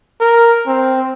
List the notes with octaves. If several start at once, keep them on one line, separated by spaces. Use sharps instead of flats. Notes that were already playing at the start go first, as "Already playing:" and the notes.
A#4
C4